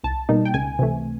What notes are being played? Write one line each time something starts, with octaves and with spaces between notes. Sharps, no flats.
C2 A5
B2 G3 A#3 D#4
G5
C#2 G#5
C3 E3 A3